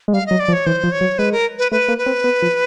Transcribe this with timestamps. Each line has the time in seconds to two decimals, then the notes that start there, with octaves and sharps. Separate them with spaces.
0.08 G#3
0.13 G3 F5
0.26 F#3 D#5
0.40 D5
0.48 F3
0.53 C#5
0.66 E3 C5
0.84 F3
0.92 C#5
1.01 F#3
1.18 G#3 B4
1.32 A#4
1.58 B4
1.72 A3 B4
1.88 A#3
1.98 B4
2.06 C4
2.24 B3
2.42 F3